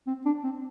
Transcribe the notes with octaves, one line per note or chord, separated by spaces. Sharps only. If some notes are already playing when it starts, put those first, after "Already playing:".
C4
D4
C4